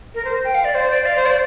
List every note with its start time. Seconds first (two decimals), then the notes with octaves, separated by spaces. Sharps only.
0.15 A#4
0.25 C5
0.44 G5
0.55 F5
0.65 D5
0.75 C5
0.90 D5
1.06 F5
1.16 C5
1.26 D5